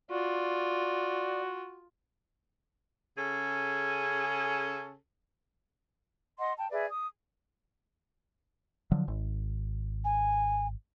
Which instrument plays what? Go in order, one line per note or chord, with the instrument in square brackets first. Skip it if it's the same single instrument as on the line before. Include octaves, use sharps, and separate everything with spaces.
[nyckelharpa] F4 [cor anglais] F#4 [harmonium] D5
[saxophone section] C#3 C#4 G#4 A4
[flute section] D#5 F#5 C6
G5 A5
G#4 B4 D5 E5
D#6
[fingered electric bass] D3 F3 F#3
G#1
[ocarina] G#5